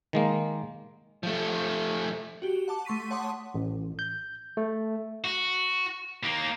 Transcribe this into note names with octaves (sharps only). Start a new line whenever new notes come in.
D#3 G#3 A#3
F3 A3
F#4 G4
F#5 A5 D6
A3 C6 C#6 B6 D#7
C#5 F#5 A5 C6 D6 D#6
A1
G6
A3
F#4
D#2 A#3